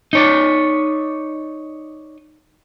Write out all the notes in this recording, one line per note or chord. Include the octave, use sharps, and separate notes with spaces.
D#4 C#5 D5